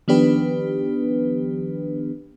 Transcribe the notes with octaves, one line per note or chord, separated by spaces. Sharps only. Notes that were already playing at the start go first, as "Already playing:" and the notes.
D#3 F3 B3 D4 G4 B4